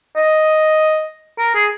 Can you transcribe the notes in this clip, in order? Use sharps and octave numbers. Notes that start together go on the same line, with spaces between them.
D#5
A#4
G#4